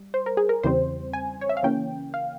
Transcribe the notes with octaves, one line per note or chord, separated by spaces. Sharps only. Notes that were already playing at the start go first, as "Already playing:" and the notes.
Already playing: G3
C5
A#4
G#4
A#4
E2 C#3 E3 G3 C4 C5
G#5
C#5
E5
F5
C#3 E3 A#3 C#4 G5
F5